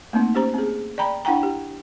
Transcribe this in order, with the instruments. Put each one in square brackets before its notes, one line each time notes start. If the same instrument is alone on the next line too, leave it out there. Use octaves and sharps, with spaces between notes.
[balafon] A3 A#3 C4 D#4
C#4 G4 C5 A#5
C4 G#4
D5 G5 A#5 B5
D4 E4 F#5 G5 A#5
G4